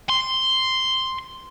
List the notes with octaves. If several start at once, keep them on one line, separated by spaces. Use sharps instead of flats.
C6